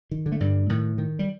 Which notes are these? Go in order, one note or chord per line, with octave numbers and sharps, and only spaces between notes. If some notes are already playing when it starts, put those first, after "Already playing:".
D#3
D3
A3
G2 G3
A2 D#3
D#3
G3